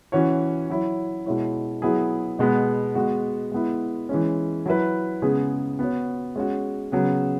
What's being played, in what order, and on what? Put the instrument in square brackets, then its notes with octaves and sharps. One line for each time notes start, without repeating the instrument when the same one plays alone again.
[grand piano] E3 C#4 F#4 C#5
F#3 E4 C#5
B2 G#3 E4 C#5
F#3 B3 E4 G#4
B2 G#3 B3
G#3 B3 F#4
G#3 B3 E4
E3 G#3 C#4
F#3 E4 B4
C#3 G#3 B3 G#4
B3 F#4 C#5
G#3 C#4 F#4
C#3 F#3 B3